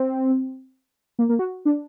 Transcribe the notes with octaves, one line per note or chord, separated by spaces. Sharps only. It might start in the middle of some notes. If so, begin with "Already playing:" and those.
Already playing: C4
A#3
A#3
F#4
D4